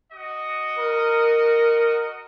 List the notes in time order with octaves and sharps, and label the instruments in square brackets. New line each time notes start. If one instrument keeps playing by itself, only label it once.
[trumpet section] F#4 D#5
[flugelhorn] A#4